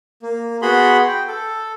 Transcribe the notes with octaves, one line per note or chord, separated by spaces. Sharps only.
A#3
B3 F#4 G#4 B5 C6
G5
A4